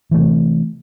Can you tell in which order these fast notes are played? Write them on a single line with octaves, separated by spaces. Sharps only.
E3 A3 C3